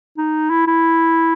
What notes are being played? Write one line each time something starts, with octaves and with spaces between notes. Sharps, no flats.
D#4
E4
E4